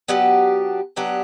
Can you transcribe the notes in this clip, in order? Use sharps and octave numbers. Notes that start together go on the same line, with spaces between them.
F#3 B3 D4 G4
F#3 B3 D4 G4